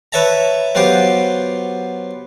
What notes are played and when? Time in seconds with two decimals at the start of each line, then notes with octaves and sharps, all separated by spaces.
0.12 B4 C#5 E5 A5 A#5
0.75 F#3 B3 F4 G4 C5